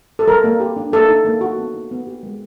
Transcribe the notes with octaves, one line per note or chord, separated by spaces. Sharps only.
A4
G3 A#4
A#3
G4
D4
A#3 A4
D#4
A#3
F#4
B3
D#4
B3
G4
G#3